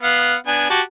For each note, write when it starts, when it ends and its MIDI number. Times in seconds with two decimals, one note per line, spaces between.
0.03 0.35 59
0.03 0.35 77
0.03 0.35 78
0.47 0.66 59
0.47 0.66 62
0.47 0.66 80
0.70 0.81 66
0.70 0.81 67
0.70 0.81 81